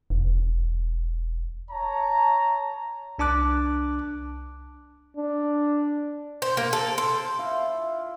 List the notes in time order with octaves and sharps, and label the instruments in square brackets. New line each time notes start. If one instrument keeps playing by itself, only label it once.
[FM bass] E1
[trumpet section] C#5 A5 A#5
[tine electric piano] C2 D4 A5 D6 F#6
[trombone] D4
[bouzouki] C5
A#3
A4
C5
[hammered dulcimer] E4 F4